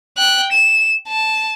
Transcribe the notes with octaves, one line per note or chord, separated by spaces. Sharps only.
G5 F#6
E7
A5